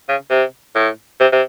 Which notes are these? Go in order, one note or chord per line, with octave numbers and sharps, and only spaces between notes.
C#3
C3
A2
C3
C3